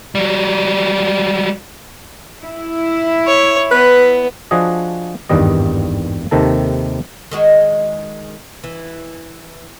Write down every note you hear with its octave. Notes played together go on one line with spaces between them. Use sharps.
F#3 G3
E4
C#5
B3 B4
F3 D4 F#4 G#4 D#5
G#1 E2 G2 D#3 G3 D#5
D#2 C3 D#3 A4 A5
D#3 G#3 F#4
E3